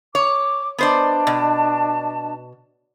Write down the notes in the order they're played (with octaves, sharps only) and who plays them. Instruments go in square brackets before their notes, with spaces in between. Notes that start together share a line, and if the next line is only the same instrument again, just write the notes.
[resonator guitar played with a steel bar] C#5 [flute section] D6
[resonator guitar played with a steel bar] B3 C5 D5 [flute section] D4 D#5 A5
[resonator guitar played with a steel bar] B2